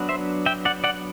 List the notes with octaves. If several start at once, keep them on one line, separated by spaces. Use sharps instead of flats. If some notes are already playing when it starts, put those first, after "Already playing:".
Already playing: F#3 B3 D4
C5 E5
E5 G5
D5 F#5
D5 F#5